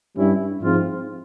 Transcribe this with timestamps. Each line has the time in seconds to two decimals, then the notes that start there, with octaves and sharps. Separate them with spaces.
0.16 G2 G3 C#4 E4
0.62 G#2 F3 C4 F4